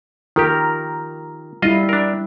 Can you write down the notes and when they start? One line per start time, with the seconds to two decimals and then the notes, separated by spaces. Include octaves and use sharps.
0.36 D#3 F4 G4 A#4
1.62 G3 E4 F4 D#5
1.89 D4 A#4